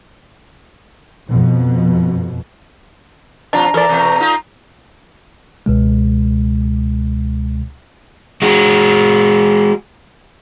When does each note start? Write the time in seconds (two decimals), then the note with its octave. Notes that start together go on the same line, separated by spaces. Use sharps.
1.29 F2 B2
3.53 B2 F3 D4 F4 A#5
3.74 E3 A4 A#4 D5
3.89 B2 E3 A3
4.20 A3 D#4 F4
5.66 C#2 B2 G#3
8.42 G#3 F#4